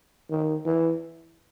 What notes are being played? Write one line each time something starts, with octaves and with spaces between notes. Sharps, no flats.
D#3
E3